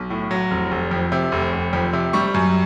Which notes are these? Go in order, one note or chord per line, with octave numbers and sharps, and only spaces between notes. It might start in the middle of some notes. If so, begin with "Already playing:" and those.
Already playing: B1
A2
F#3
F1
F1
F2
C3
F1
F1
F2
C3
G3 C#6
F#2